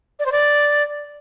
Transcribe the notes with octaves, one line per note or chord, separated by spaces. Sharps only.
D5
C5
D5